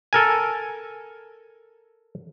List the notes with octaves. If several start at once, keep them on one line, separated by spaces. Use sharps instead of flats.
A4 A#4 G#5